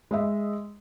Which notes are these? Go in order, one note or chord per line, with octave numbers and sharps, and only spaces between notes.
G#3 D#5 E5